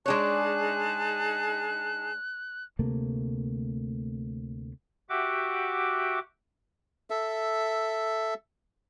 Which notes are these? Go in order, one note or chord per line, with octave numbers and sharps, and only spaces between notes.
G#3 D4 D#4 G#4 C#5 A5 F#6
D2 C3 A3 A#3
F#4 G4 E5 F#5 D6
A4 E5